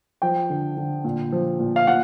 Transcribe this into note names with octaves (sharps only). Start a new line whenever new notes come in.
F3 G5
D3
D3
A#2
F3
A#2
F5
A#2 F#5